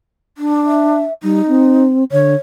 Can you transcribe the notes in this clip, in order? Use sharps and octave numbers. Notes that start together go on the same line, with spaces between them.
D4
E5
G3 D#4
C4
D3 C#5